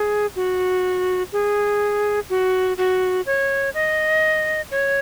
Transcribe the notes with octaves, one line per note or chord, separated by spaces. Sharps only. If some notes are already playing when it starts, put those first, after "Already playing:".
Already playing: G#4
F#4
G#4
F#4
F#4
C#5
D#5
C#5